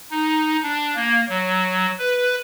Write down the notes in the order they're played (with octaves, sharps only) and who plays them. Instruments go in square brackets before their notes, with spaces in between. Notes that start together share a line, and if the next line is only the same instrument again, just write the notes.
[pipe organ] D#4
D4
A#3
F#3
B4